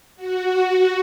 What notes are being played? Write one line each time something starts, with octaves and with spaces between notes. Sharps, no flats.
F#4